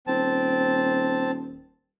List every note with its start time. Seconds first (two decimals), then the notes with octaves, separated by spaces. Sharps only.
0.07 D#1 C4 A5